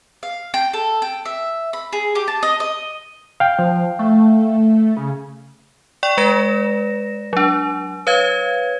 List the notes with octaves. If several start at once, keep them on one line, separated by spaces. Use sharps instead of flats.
F5
G5
A4
G5
E5
B5
G#4
G4
A5
D#5
D#5
F5 G5
F3
A3
C#3
D5 G5 C#6
G#3 B4 D5 A#6 E7
F#3 D4
B4 C#5 F5 G#6